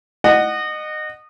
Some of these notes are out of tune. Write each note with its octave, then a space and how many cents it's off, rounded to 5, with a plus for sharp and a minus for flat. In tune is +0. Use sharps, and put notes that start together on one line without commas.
D#5 -25 F#5 +0